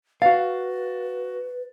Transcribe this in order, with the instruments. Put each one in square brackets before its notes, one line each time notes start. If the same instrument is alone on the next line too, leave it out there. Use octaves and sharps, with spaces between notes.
[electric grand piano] F#4 A6 [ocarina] B4 [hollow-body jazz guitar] F5